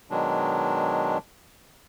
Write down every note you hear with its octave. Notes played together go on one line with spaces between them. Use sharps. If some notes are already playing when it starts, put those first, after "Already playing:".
B2 D#3 F#3 G#3 D4